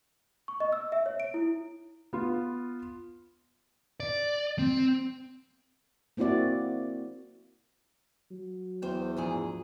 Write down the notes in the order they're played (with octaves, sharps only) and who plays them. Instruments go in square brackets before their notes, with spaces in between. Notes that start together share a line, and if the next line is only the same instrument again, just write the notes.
[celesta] C#6
D#5
E6
E5
C#5
D7
E4
[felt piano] B3 F4
[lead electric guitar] D5
C4
[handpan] A#3 C4 E4 F#4 D5
[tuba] F#3
[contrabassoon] E2 [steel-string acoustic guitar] C5 G5
[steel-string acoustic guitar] D2 G#2 G#4 [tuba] F3